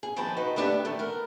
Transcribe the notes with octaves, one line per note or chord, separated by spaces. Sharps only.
G#4
D#3 F3 B4 G5 A5
D#4 F#4 B4
A3 B3 D4 G4 B4
D#3 E3 A3
B3 A#4